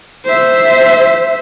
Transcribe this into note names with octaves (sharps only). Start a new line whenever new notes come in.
C5 E5